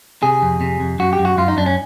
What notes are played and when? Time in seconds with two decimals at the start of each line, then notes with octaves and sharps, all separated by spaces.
0.23 C3 G#4
0.42 F2
0.61 C3
0.80 F2
0.99 F#2 F#4
1.13 G4
1.19 F#2
1.25 F#4
1.37 F#2 F4
1.48 D#4
1.57 F#2 D4
1.66 C#4